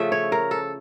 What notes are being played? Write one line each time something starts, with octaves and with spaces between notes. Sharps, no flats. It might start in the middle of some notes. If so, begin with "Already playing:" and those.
Already playing: C#3 F3 A3 E5
C#5
A#4
A4